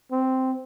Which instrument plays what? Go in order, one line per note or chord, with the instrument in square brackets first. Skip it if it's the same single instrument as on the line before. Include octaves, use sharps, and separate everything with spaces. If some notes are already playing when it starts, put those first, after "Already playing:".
[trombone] C4